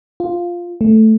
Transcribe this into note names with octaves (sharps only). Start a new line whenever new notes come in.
F4
A3